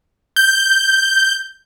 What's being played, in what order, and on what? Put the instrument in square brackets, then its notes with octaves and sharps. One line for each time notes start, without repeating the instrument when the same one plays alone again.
[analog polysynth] G6